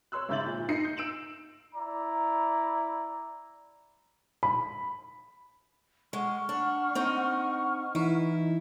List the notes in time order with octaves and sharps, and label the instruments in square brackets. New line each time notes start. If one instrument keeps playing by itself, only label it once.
[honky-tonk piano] C#5 C6 E6 F#6
G#1 C#3 E5 G6 A6 F#7
A#2
D#4 C7 C#7
G6
E6 D7 E7 F#7
[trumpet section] E4 D5 A#5
[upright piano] B5
[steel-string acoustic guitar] G#3 [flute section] F#5 C#6 F6
[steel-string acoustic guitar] D4
C4 D#4
[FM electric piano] E3 D#4 [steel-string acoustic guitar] E4